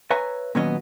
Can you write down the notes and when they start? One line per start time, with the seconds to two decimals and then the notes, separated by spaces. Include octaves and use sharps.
0.11 B4 C#5 E5 G#5 A#5
0.55 A#2 D#3 F#3 B3 C#4 D#5